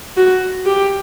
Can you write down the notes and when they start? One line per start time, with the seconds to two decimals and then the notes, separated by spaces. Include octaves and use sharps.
0.17 F#4
0.66 G4